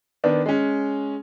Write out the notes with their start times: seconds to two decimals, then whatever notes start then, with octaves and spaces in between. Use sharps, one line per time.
0.24 D#3 B3 D4
0.46 G#3 C#4